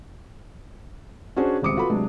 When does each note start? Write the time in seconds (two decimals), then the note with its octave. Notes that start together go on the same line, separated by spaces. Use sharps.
1.36 C#4 D4 F#4 G#4 C5
1.62 D#1 C#2 C4 D6 D#6 C#7
1.77 F4 F#4 A4 B4 B5
1.89 C3 F#3 G#3 D4